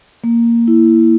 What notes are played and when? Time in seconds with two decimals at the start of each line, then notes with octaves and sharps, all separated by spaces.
0.24 A#3
0.68 E4